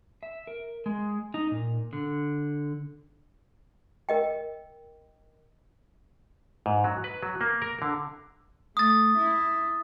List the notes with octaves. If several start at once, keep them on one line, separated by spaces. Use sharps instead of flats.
E5
A#4
G#3
D#4
A#2
D3
A#4 D#5 G5
G#2
F#3
B4
F#3
A#3
A#4
D3
A3 D#6 A6
E4